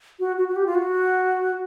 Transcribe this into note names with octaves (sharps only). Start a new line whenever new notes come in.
F#4
F#4
F#4
G4
F4
F#4